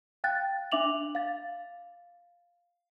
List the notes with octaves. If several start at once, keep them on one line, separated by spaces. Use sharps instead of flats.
F5 G5 F#6 A6
D4 E5 D6 F7 F#7
F5 A6